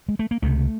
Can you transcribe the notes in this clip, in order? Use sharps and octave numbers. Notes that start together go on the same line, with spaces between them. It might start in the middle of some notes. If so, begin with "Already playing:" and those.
G#3
A3
A#3
C#2 C3 A3